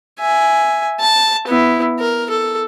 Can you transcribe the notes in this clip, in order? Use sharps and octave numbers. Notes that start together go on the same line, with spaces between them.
E5 G#5
A5
B3 E4
A#4
A4